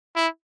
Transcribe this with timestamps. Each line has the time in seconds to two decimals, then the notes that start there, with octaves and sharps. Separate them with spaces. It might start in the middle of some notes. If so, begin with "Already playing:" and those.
0.16 E4